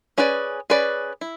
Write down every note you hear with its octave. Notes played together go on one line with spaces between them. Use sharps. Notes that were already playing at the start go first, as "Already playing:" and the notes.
C#4 G#4 B4 D5
C#4 G#4 B4 D5
E4